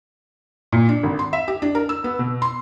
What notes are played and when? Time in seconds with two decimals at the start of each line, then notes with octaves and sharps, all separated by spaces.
0.72 A#2
0.89 D4
1.03 G#1
1.19 C6
1.33 E5
1.48 G4
1.62 D4
1.75 A#4
1.89 E6
2.04 B3
2.19 B2
2.42 C6